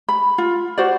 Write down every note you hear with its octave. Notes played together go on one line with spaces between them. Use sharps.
B5
F4
F#4 C5 D5